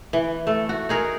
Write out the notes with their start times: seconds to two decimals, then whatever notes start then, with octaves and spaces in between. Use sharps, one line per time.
0.13 E3
0.47 A3 A4
0.69 F#4
0.89 D#4 G#4 A#4